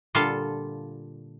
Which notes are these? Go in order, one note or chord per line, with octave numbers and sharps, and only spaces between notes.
A#2 D3 G3 F4 A4